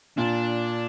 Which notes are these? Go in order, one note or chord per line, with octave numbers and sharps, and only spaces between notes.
A#2 D4